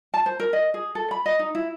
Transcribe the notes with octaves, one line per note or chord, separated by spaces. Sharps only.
A5
C5
A#4
D#5
G#4
A4
B5
D#5
D#4
E4